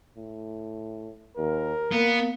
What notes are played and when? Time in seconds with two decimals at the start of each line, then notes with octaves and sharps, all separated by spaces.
0.17 A2
1.37 D#2 A#4
1.92 A#3 B3